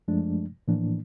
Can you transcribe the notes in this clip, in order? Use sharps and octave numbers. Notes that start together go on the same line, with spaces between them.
F#2 F3 G#3 A3 D4
A2 E3 F3 A#3 D4